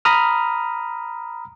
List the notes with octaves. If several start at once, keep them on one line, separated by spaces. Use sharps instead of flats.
A#5 B5 D#6 F6